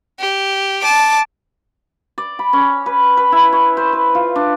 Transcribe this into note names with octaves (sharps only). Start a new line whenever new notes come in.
G4
A5 D6
D5
B5
C#4
B4
B4
E4
C#5
C5
B4
F4
D4